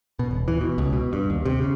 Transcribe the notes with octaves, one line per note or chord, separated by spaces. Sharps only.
B2
D#1
E3
B2
C#2
B2
G2
D#2
C3
C#3